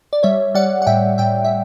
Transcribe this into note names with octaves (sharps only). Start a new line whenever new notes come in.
D5
G3 C#5 E5
G3 D5 F#5
F#5
A2 E5 G5
A2 E5 G5
E5